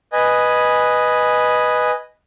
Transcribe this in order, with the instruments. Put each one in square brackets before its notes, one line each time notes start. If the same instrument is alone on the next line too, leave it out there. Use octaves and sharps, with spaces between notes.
[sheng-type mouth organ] B4 D#5 G#5